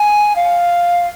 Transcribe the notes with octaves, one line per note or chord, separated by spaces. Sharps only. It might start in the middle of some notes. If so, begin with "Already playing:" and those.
Already playing: G#5
F5